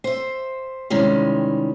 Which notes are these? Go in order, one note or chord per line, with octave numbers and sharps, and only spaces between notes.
C5 E5
C3 D#3 E3 G3 G#3 C#4